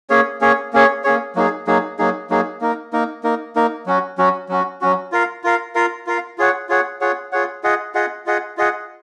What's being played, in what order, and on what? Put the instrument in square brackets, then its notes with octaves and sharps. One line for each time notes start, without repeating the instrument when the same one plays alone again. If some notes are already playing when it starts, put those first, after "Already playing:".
[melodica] A#3 C#4 G#4 C#5
A#3 C#4 G#4 C#5
A#3 C#4 G#4 C#5
A#3 C#4 G#4 C#5
F#3 A#3 D#4 G#4
F#3 A#3 D#4 G#4
F#3 A#3 D#4 G#4
F#3 A#3 D#4 G#4
A#3 D#4 A#4
A#3 D#4 A#4
A#3 D#4 A#4
A#3 D#4 A#4
F#3 C#4 F#4
F#3 C#4 F#4
F#3 C#4 F#4
F#3 C#4 F#4
F4 A#4 F5
F4 A#4 F5
F4 A#4 F5
F4 A#4 F5
F4 G#4 C#5 F#5
F4 G#4 C#5 F#5
F4 G#4 C#5 F#5
F4 G#4 C#5 F#5
F4 G#4 D#5 F#5
F4 G#4 D#5 F#5
F4 G#4 D#5 F#5
F4 G#4 D#5 F#5